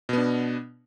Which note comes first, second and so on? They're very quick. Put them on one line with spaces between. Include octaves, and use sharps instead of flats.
B2 B3 D4